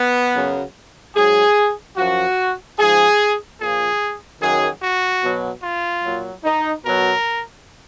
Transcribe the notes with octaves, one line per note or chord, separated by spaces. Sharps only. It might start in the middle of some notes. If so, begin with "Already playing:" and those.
Already playing: B3
F#2 C#3 F#3
G#2 F#3 G#4
F#2 F3 F#4
G#2 F3 G#4
A#2 F3 G#4
F#2 D#3 F#3 G#4
F#4
B2 F#3
F4
A#2 F#3
D#4
B2 F#3 A#4